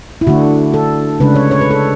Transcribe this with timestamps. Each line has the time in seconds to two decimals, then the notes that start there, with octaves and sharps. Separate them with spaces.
0.21 E4
0.27 D3 A3 D4 F#4
0.74 A4
1.20 C#3 G#3 D4 B4
1.35 C#5
1.51 C#5
1.61 B4
1.71 A4